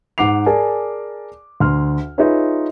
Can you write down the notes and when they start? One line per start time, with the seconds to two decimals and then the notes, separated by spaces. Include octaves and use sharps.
0.18 G#2 F#5 D6 C7 F7
0.46 G#4 A#4 D5 G#5 A5
1.60 D2 C6 F6
2.18 D#4 F4 G#4 B4 C#5 E5